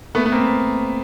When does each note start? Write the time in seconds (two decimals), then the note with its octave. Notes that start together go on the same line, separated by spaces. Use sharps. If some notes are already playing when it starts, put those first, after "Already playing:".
0.15 A3 B3
0.26 B3
0.32 A#3 C4